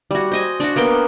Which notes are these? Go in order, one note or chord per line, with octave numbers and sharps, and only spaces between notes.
G3 F#4
C5 D#5 G#5
D4 F#4
A#3 B3 G5 C6